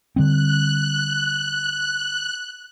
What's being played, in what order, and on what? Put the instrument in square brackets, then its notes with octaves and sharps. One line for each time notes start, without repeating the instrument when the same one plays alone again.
[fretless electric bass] D3 G3 C4 [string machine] F#6